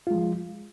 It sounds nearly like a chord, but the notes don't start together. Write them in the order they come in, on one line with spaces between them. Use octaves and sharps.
F4 G#3 F3